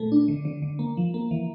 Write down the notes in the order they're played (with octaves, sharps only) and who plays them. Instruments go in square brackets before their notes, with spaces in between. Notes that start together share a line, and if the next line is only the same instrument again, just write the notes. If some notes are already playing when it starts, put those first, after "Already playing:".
Already playing: [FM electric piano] A#2 A3
D4
D3
D3
D3
A#3
F3
A#3
E3